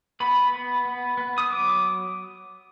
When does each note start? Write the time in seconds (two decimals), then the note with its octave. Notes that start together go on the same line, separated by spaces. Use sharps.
0.20 B3 B5
0.52 B3
0.85 B3
1.17 B3
1.38 D#6
1.50 F#3 D6